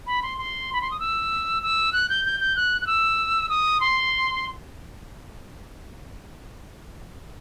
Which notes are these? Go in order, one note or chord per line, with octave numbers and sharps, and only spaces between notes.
B5
C6
C6
B5
C6
D#6
E6
E6
F#6
G6
G6
G6
F#6
F#6
E6
D#6
C6